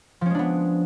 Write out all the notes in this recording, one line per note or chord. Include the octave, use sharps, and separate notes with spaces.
F3 G#3 B3 C#4 D4